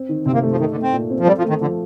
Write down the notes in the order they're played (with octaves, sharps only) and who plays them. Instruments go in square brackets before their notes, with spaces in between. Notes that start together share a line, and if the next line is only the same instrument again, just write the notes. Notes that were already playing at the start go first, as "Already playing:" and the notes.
Already playing: [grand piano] C4
D#3
[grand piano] C3 [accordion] C4
[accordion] A#3
[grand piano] A3
[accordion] F3
[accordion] D#3 [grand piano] D#4
[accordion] D3
[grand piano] A3
[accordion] C4
[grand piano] A#2
C4
[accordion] F3
[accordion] G3 [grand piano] A4
[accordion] F3
[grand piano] A3
[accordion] D#3
[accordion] D3 [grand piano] F3